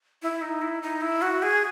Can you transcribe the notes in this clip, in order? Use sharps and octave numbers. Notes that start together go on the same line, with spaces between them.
E4
D#4
E4
D#4
E4
F#4
G#4